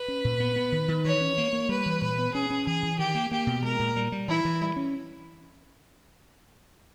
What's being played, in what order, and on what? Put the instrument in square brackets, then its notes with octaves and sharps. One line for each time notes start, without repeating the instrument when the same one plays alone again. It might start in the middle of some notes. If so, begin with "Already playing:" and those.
Already playing: [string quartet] B4
[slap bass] C#4
A#2
B3
B3
D#3
D#3
[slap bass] E3 [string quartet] C#5
[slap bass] C#4
A#3
A#3
[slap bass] G3 [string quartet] B4
[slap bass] E3
[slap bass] A#2 [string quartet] B4
[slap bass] B3
[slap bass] C#4 [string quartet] G#4
[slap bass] C#4
[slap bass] E3 [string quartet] G#4
[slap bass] E3
[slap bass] D#3 [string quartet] G4
[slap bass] A#3
[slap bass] A#3 [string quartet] G4
[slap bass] B2
[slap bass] G#3 [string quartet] A#4
[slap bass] A#2
G3
G3
[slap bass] E3 [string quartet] E4
[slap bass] E3
G3
C#4